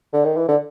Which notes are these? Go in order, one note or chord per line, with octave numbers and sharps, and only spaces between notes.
D3
D#3
E3
D3